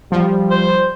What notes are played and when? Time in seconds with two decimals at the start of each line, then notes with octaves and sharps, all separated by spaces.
0.12 F3 G3
0.50 C5